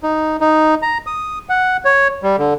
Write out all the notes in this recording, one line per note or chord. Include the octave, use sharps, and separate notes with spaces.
D#4
D#4
A#5
D#6
F#5
C#5
G3
D3